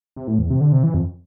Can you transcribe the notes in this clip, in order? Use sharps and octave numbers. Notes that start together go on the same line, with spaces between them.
C3
A2
E2
C3
D3
C3
E3
F2